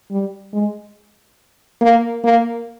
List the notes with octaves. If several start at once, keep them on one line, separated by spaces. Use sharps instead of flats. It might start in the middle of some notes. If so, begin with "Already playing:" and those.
G3
G#3
A#3
A#3